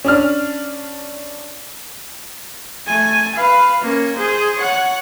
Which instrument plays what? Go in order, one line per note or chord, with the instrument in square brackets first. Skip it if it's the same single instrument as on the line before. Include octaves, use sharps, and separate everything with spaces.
[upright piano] C#4 D4 F6
[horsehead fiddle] A3 G#5
B4 F5
A#3 C#4
G#4 C5
C#5 F#5